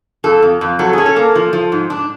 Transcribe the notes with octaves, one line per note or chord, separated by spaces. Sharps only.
F2 A4
F2
F2
F#3 A4
C#4 G#4
A4
A#3
F3
F3
G#2
D4